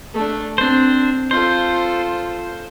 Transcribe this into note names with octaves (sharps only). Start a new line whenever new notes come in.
A3 D4
C4 D4 C5
F4 A4 C5